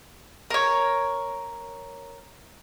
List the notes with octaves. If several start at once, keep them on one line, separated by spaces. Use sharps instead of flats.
A#4 C#5